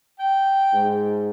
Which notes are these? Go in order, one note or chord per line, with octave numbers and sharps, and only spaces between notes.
G5
G#2